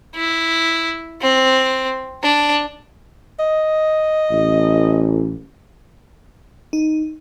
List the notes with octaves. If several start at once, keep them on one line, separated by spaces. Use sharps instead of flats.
E4
C4
D4
D#5
A1
D#4